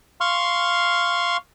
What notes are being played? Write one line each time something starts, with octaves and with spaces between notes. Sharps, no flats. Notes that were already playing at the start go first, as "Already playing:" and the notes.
F5 C6 C#6 F6